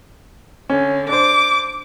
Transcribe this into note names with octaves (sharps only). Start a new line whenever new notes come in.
D3 C#4
D4 C5 D6